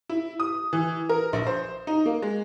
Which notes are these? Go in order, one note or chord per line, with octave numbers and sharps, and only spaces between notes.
E4
D#6
E3
A#4
A#1
C5
D#4
A#3
G#3